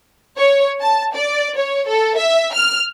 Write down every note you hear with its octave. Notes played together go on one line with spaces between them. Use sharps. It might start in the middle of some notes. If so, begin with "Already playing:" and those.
C#5
A5
D5
C#5
A4
E5
F6